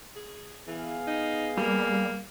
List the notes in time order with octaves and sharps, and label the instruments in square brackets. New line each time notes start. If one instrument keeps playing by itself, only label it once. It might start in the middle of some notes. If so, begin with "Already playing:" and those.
[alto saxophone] G#4
[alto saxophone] E3 [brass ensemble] B3 G#4 F5
[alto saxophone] D#4
[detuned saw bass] G3 [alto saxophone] A#3